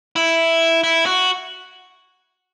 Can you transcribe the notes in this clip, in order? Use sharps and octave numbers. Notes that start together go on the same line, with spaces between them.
E4
E4
F#4